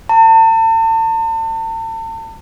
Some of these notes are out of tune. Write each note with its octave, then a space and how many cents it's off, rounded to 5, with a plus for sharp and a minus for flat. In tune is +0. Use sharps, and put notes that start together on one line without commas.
A5 +40